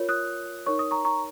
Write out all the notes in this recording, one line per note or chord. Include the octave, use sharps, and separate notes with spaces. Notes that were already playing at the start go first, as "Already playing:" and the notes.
Already playing: F4 A#4 C#5
D#6 F#6
D#4 A#4 C#5 C#6
D#6
A#5 C#6
A#5 C#6